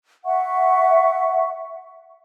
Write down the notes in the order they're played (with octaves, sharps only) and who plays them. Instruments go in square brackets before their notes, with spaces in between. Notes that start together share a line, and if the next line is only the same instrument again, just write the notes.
[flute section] E5 F#5 C#6